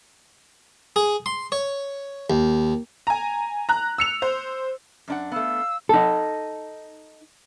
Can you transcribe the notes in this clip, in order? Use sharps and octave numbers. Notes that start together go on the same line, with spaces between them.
G#4
C6
C#5
D#2
G#5 A#5
A#5 F#6
E6 C#7 F7
C5
F#2 D4 F#5
A3 B3 F5 E6
D#4 A4